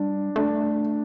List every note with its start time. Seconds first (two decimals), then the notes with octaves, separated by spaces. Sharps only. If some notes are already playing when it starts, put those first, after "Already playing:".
Already playing: G3 D4
0.36 A3 D4